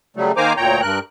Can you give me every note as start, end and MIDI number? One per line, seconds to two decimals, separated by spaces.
0.16 0.32 49
0.16 0.32 54
0.16 0.32 55
0.16 0.32 57
0.37 0.53 51
0.37 0.53 58
0.37 0.53 72
0.37 0.53 80
0.37 0.53 82
0.37 0.53 86
0.57 0.81 38
0.57 0.81 46
0.57 0.81 73
0.57 0.81 79
0.57 0.81 82
0.82 0.99 43
0.82 0.99 70
0.82 0.99 90